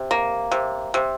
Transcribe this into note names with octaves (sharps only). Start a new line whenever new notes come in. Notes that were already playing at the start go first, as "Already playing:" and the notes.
Already playing: C3
A#3
C3
C3